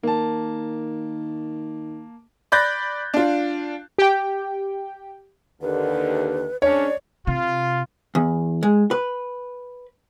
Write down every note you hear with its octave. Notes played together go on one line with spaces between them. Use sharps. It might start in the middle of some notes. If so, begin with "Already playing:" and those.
D#3 A#3 A5
D5 B5 F#6 G6 A6 A#6
D4 F4
G4 G5
D#2 D3 B4
G#2 C#4 D4 C#5 D5
C3 F4
E2
G#3
B4